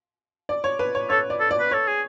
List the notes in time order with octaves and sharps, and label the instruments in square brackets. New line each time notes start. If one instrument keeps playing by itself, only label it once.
[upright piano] D5
C#5
B4
C#5
[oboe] A4 [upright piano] C#5
[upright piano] D5
[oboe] A4
[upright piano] D5
[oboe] B4
[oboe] A4 [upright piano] C#5
[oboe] G#4